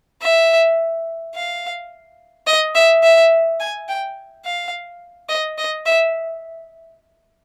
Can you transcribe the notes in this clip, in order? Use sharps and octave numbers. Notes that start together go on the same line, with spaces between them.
E5
F5
D#5
E5
E5
G#5
G5
F5
D#5
D#5
E5